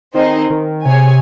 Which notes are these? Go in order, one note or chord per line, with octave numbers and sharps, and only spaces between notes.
D#3 C4 D#4 G#4 C5 D#5
D#3
C3 G#4 C#5 G#5